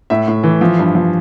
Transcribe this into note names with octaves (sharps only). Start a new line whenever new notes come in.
A2 E5
A2
E3
F3
G2
F3